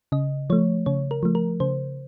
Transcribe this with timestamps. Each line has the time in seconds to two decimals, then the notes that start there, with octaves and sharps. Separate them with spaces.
0.12 C#3 D#5
0.50 F3 A3 C#5
0.86 C#3 C#5
1.11 A#4
1.23 F3 A3
1.35 A#4
1.60 C#3 C5